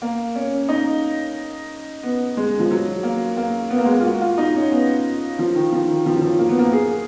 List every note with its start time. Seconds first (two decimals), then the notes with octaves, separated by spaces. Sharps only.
0.02 A#3
0.35 C#4
0.69 D#4
2.03 B3
2.37 G#3
2.59 F3
2.71 F#3
3.03 A#3
3.37 A#3
3.70 B3
3.78 A#3
3.86 G#3
3.93 A#3
4.00 F4
4.05 F#4
4.21 F4
4.38 D#4
4.55 C#4
4.71 B3
5.39 F3
5.55 D#3
5.72 F3
5.88 D#3
6.06 F3
6.14 F#3
6.21 F3
6.39 A#3
6.49 B3
6.59 A#3
6.73 G#4